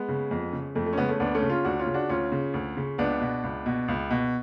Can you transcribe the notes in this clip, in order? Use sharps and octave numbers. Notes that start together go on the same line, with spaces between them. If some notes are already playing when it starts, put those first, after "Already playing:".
Already playing: G#3 B3
C#3
F2
C#3
F2 A3
A3
C#4
C#3 G#3 B3
A3 C#4
D2 B3 D4
A3 C#4
C#3
C#4 F4
D2 D4 F#4
C#4 F4
C#3
D4 F#4
D2 C#4 F4
C#3
D2
C#3
C#2 B3 D4
B2
C#2
B2
C#2
B2